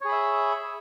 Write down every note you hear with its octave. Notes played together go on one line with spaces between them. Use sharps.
G#4 C#5 E5 B5